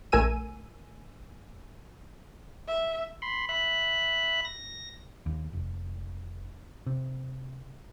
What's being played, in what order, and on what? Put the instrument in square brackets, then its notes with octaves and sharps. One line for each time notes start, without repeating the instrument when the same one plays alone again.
[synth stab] A#1 A3 A#4 G#5 E6 D#7
[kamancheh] E5
[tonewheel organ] B5 C6
E5 B5 F#6
A#6
[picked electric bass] D#2
F1
C3